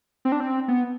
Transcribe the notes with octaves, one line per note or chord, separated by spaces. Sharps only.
C4
D4
C4
B3